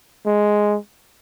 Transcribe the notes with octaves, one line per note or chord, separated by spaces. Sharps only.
G#3